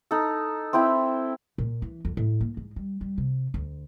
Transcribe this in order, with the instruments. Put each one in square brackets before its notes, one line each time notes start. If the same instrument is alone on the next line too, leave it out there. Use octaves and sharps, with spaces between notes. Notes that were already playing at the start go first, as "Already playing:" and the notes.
[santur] D#4 A4
C4 E4 G5 B5
[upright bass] A#2
E3
F2
A2
A#3
G#2
G3
G3
C3
D2